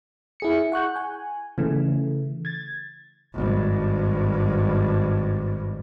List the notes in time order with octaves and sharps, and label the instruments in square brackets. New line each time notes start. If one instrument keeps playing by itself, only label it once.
[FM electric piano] E4 G#4 C#7
F#5 C#6 F#6 G6
G#5
C#3 E3 A3
G#6 A6
[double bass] G#1 G2